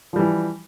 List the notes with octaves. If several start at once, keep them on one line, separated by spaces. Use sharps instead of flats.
E3 F3 G3